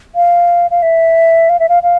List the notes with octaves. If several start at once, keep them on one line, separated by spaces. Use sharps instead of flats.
F5
F5
E5
F5
E5
F5
F5